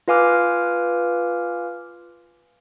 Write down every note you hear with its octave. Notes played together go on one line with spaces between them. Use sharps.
F4 B4 F5 G#5 D6 F6